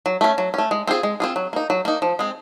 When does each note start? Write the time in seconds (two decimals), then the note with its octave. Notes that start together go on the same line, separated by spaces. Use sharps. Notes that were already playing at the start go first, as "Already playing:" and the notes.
0.06 F#3
0.21 A3 C#4
0.38 F#3
0.54 A3 C#4
0.71 G#3
0.87 C4 F4 G#4
1.03 G#3
1.20 C4 F4 G#4
1.36 F#3
1.53 A#3 D#4
1.70 F#3
1.85 A#3 D#4
2.02 F3
2.19 G#3 C4